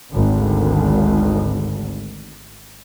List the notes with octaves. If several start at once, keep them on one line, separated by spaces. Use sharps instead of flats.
G#1 D2